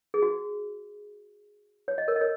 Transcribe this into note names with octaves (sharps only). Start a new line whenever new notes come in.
G#4
F#4
C#5
D#5
A#4 C#5
D#5
A#4 C#5